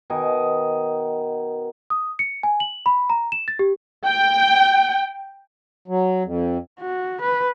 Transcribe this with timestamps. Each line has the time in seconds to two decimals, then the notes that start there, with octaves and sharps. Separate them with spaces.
0.10 B2 D#3 D#5 G#5
1.90 D#6
2.19 C#7
2.43 G#5
2.60 F#7
2.86 B5
3.10 A#5
3.32 E7
3.48 A6
3.59 G4
4.07 G5
5.88 F#3
6.24 F2
6.80 F#4
7.22 B4